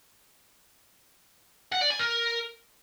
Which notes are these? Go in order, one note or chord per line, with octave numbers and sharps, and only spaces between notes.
F#5
D5
G#5
A#4